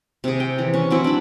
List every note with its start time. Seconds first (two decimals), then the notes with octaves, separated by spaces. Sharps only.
0.24 C3 G#4
0.40 G5
0.58 E3 A#5
0.74 C#4
0.90 F#3 C4 E4
1.04 D4 B5